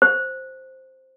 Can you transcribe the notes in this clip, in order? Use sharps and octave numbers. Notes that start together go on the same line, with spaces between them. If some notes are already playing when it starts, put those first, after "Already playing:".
C5